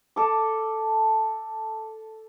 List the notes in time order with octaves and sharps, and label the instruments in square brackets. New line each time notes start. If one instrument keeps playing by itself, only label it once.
[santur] A4 D6